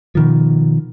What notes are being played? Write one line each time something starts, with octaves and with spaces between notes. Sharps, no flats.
B2 D#3 F3